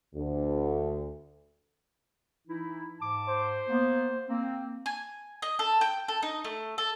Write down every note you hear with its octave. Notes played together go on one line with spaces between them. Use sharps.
D2
E3 D#4 E4
G#2 A5 D6
C5
A#3 B3
A#3 C4
G#5
D#5
A4
G5
A4
D#4
A3
A4